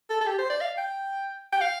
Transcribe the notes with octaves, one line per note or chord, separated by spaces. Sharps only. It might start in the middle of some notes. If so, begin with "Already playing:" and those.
A4
A4
G4
C5
D5
F5
G5
G5
F5